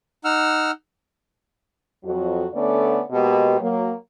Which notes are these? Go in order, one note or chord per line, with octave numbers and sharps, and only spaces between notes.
D#4 F#5 E6 F6
F2 F#3 F#4
D3 A3 B3 C#4 D5
B2 G#3 A#3 B3 G4
F#3 A#3